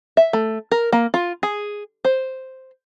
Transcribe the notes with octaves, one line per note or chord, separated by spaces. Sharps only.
E5
A3
A#4
A#3
F4
G#4
C5